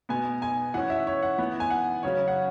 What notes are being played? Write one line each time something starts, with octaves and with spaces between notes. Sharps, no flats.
B2 B3 G#5
G#5
E3 C#4 F#5
E5
C#5
F#5
E3 B3
G#5
F#5
C#3 F#3 C#4 C#5
F#5